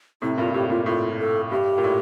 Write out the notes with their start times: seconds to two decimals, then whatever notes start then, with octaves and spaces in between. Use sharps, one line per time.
0.22 A2 C3 E4
0.37 G2 A#2 F4
0.53 A2 G4
0.70 G2 A#2 F4
0.86 A2 F4
1.18 A4
1.51 G2 G4
1.78 A#2
1.84 A2